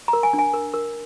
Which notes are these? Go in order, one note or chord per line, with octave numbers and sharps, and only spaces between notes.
A#5
A#4
G#5
D4
G#5
A#4
A#4